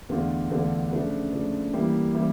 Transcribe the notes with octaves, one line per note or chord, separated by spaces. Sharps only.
E2 D3 A3 D4 F4
E2 D3 A3 D4 F4
C#3 F3 A3 D4
C#3 F3 A3 D4
E3 G3 A#3 E4 G4
E3 G3 A#3 E4 G4